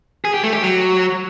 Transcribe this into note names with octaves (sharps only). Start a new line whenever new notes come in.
G#4
G4
A3
G4
F#3